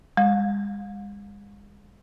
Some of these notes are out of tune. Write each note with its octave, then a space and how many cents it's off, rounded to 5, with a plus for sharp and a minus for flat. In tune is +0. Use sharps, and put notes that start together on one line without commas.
G#3 -40